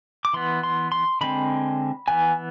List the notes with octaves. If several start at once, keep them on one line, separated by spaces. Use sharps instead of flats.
D6
E3 B3 C6
C6
C6
D3 G#3 C4 B5
E3 B3 G#5